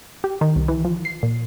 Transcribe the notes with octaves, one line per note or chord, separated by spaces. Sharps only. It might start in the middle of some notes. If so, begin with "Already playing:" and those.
G4
D#3
C2
E3
F3
C7
A#2